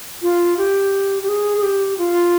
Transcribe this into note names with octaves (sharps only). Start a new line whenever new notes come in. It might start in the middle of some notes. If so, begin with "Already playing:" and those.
F4
G4
G4
G#4
G#4
G4
F4